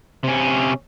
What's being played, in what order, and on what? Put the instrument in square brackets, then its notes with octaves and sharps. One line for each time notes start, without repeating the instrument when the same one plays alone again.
[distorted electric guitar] C3 C#4